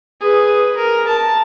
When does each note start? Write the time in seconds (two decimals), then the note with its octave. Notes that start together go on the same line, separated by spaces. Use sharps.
0.21 G#4 B4
0.76 A#4
1.07 A5